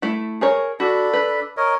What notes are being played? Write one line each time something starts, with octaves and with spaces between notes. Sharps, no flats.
A3 E4
G#4 A#4 C#5
D4 F#4 A4 B5
B4
A#4 C#5 D#5